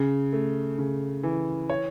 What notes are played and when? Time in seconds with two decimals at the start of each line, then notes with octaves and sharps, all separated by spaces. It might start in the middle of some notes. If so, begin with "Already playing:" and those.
Already playing: C#3
0.33 A3
0.78 C#3
1.23 E3
1.70 C#5